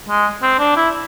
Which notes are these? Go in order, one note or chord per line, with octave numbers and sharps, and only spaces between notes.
G#3
C4
D4
E4